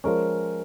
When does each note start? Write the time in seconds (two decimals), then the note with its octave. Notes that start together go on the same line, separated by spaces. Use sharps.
0.04 F3 G#3 C#4 A#4